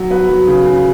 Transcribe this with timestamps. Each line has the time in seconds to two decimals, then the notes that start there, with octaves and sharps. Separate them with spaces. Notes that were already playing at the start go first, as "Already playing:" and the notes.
Already playing: F#3
0.10 B3 B4
0.29 F#3
0.47 C#3
0.66 C#3